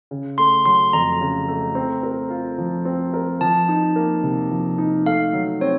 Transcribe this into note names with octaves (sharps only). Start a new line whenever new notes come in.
C#3
A3 C6
F#3 C6
F2 A#5
C#3
A3
C4
A#4
F4
F3
C4
A#4
F3 A5
D#4
A#3
C3
F3
D#4
A3 F5
F#3
C4 C#5